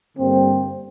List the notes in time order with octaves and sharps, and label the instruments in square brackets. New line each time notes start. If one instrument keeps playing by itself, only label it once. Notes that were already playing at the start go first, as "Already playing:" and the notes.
[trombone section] G2 D3 G3 A#3 C4